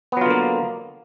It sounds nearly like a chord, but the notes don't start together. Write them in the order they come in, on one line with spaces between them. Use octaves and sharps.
B3 F#3 F4 D3 A#3